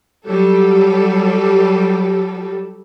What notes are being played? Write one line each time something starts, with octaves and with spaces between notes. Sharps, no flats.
F#3 G3 A4